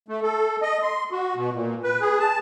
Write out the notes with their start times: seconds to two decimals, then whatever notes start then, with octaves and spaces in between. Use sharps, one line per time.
0.08 A3
0.22 A4
0.62 D#5
0.83 C6
1.11 F#4
1.35 B2
1.53 A#2
1.84 B4
2.01 G#4
2.19 A5